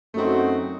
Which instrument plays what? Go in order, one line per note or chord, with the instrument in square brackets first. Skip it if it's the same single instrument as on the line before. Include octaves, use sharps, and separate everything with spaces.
[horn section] F#2 F#3 C4 D#4 F#4 [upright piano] A3